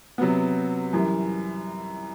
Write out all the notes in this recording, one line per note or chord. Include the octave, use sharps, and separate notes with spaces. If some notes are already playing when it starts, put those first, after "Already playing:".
C3 F#3 B3
F#2 E3 G3